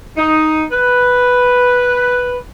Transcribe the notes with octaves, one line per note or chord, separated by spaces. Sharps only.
D#4
B4